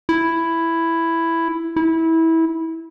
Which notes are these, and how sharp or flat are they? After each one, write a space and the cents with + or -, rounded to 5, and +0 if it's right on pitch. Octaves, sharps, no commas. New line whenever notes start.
E4 +5
E4 -20